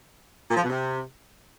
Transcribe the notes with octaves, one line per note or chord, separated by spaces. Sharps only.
A#2
F3
B2
C3